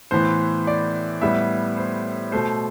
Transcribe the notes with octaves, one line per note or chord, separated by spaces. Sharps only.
A2 E3 B3 C5
D5
A2 G3 B3 E5
C5
B2 A3 C5